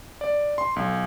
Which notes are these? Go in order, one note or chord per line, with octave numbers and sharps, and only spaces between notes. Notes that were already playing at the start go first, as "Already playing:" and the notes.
D5
C6
B1